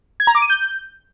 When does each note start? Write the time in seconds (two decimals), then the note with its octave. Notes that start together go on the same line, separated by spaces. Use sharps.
0.20 G#6
0.27 A#5
0.35 D6
0.42 D#7
0.50 G6